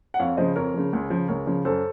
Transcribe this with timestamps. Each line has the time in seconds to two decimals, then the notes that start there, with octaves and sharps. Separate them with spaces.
0.14 F#5
0.19 F2 C#5 F5
0.37 C#3 F3 C5 D#5
0.56 F2 A#4 C#5
0.74 C#3 F3
0.93 C#2
1.10 C#3 F3
1.28 C#2 A#4 C#5
1.47 C#3 F3
1.65 F#2 A4 C5